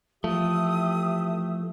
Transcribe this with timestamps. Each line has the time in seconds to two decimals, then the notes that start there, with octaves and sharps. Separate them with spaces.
0.24 E3 F3 A3 G4 E5 D#6